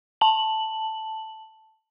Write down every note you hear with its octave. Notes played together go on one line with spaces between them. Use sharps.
A5 F#7